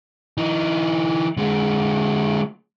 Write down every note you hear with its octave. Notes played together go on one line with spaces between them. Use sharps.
E3 D#4
D3 G#3